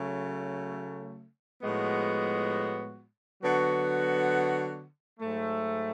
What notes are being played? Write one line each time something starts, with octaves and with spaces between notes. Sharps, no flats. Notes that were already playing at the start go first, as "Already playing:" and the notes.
Already playing: C#3 F#3 A3
A2 F3 G#3 B3 F#4
D3 F#3 B3 F#4
G#2 F#3 A3